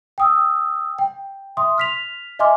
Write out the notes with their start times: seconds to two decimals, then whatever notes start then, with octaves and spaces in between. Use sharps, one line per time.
0.18 G5 D#6 E6
0.99 G5
1.57 E5 C6 D#6
1.78 F6 B6 F7
2.39 D#5 E5 G#5 C6 D6 F6